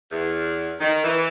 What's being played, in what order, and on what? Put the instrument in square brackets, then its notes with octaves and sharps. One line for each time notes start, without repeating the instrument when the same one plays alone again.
[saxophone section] E2
D#3
E3